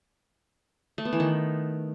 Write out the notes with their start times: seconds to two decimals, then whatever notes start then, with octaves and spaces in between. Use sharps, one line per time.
0.98 A3
1.05 B3
1.13 E3
1.20 D#3